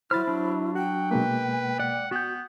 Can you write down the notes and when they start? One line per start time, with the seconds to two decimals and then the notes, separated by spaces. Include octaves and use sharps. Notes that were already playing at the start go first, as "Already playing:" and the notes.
0.11 F#3 E4 C5 B5 F6 A6
0.27 F#3 D4
0.75 F#4 F#5 G5
1.11 B2 G#3 A#3 B4
1.80 D5 F#5
2.11 B3 F#4 G6